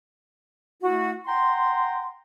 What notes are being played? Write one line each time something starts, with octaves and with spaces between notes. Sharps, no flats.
A3 E4 F#4
F#5 G5 A#5 C6